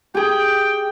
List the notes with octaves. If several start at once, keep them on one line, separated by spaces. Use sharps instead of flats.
G4 G#4 G5